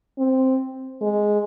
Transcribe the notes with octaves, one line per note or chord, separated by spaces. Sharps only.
C4
G#3